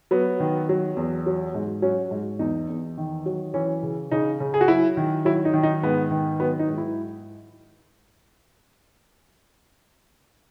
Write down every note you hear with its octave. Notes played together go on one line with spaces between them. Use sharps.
F#3 B3
D#3
F#3
E2
F#3
G#2
F#3 C#4
G#2
E2 D#4
E2
D#3
F#3
E3 C#4
C#3
C#3 D#4
C#3
G#4
F#4
F#3 E4
D#3
F#3 E4
D#4
D#3
D#4
G#2 B3
D#3
F#3 B3
D#4
G#2
E4